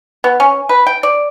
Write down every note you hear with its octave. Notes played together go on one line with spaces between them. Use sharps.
B3
C#4
B4
G5
D5